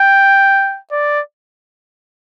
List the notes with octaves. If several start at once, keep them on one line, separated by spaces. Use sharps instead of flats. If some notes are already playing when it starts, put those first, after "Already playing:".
Already playing: G5
D5